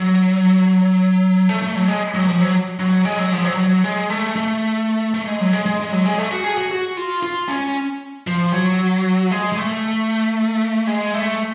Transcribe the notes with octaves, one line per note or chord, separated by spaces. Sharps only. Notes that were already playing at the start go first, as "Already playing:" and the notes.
Already playing: F#3
A3
A3
F#3
G#3
F#3
F3
F#3
F#3
G#3
F#3
F3
F#3
F#3
G#3
A3
A3
A3
G#3
F#3
G#3
G#3
G#3
F#3
G#3
A3
F#4
G#4
F#4
F#4
F4
F4
C#4
F3
F#3
G#3
G#3
A3
G#3
A3